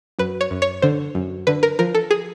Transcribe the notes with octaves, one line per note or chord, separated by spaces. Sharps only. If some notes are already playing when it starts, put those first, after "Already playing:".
F#2 B4
C#5
F#2
C#5
D3 C5
F#2
D3 B4
A#4
F3 A#4
A4
G#4